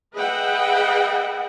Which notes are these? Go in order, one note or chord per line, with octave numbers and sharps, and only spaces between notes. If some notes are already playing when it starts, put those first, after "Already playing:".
G#4 B4 D#5 E5 F#5 G5